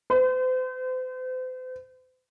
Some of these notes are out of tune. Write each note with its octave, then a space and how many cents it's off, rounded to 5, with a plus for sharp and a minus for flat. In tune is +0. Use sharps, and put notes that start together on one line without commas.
C5 -40